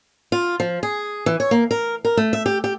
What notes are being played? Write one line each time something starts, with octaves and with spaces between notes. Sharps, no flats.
F4
F3
G#4
E3
C#5
A#3
A#4
A#4
A3
E5
G4
G4